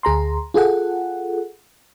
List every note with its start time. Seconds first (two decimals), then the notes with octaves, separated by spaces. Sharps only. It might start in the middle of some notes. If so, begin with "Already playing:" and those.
0.03 D2 G#4 A#5 C6
0.54 F4 G#4 A4 F#5